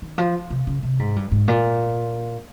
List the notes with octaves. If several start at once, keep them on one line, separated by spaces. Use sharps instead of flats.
D#3
F3
C3
C#3
C3
G#2
G2
G#2
A#2